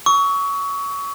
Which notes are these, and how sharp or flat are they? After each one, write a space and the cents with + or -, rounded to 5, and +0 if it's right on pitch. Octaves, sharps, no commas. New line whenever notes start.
C#6 +20 E6 -25